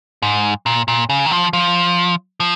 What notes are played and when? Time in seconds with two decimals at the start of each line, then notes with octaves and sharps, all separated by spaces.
0.22 G#2
0.66 A#2
0.88 A#2
1.09 C#3
1.26 D#3
1.31 F3
1.53 F3
2.40 F3